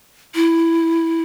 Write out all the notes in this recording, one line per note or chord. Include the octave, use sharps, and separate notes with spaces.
E4